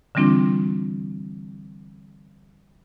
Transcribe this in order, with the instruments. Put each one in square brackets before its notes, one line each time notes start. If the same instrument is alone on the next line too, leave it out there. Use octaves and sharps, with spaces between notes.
[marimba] D3 E3 G3 C4 D4 F4